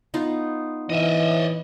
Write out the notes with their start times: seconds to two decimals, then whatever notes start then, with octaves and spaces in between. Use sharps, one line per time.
0.14 B3 D#4 F4
0.90 E3 D#5 E5